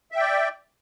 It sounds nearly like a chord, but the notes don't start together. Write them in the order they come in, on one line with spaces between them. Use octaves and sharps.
E5 G5 D5